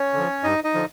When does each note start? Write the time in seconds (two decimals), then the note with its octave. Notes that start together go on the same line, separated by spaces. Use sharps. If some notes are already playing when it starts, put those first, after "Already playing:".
Already playing: C#4 C#5
0.13 D3 F3
0.44 G2 D#4 D#5
0.64 D#4 D#5
0.74 D3 F3